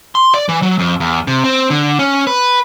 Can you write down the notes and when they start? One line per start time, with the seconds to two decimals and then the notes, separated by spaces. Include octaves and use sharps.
0.15 C6
0.34 D5
0.49 E3
0.62 F#3
0.79 F2
1.00 E2
1.27 C3
1.44 C4
1.70 D3
1.99 C#4
2.27 B4